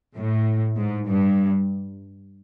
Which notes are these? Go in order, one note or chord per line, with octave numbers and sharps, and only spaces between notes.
A2
G#2
G2